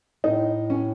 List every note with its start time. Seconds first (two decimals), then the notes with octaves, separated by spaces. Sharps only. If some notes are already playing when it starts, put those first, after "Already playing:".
0.24 A2 D#4
0.70 C#4